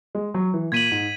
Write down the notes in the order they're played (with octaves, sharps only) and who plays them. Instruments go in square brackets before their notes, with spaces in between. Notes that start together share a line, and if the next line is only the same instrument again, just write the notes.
[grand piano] G#3
F#3
E3
[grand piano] A#2 [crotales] G#6 B6 D#7 F#7
[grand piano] G#2